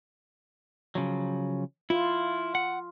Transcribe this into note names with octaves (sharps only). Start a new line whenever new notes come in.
C#3 F3 F#3
E4 F4
F#5